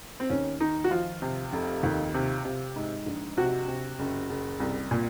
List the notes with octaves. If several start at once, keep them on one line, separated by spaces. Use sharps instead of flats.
C4
D#2 C#4
D#3 D#4
F#4
F3 F4
C3
F1
D#2
C3
C3
G#2
A#1
C3 F#4
C3
F#1
F#1
C2
A#2